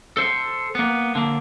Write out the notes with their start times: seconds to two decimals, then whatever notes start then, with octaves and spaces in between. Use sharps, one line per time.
0.17 A4 C5
0.75 A#3 B3
1.15 D3 A#3